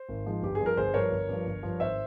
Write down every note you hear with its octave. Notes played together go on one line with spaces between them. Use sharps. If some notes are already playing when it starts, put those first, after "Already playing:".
Already playing: C5
G#1
G#2 F3 G#3
G1 G4
G#4
G2 F3
A#4
G1 G#4 C5
G2 F3 A#4 C#5
G1
G2 F3
G1
G2 F3
G#1 C5 E5